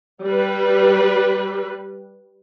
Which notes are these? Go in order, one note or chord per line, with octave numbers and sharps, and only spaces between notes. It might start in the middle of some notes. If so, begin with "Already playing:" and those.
G3 B4